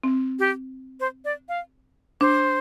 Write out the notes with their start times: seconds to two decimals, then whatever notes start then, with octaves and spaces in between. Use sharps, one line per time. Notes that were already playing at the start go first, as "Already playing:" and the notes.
0.04 C4
0.39 G4
1.00 C5
1.25 D5
1.49 F5
2.21 D4 C5